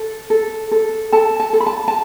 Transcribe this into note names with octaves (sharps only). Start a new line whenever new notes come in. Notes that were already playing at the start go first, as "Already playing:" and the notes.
Already playing: A4
A4
A4
A4 A5
A5
A4
B5
A5
A5